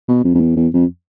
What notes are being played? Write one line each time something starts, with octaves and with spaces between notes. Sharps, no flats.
B2
F2
F2
E2
E2
F2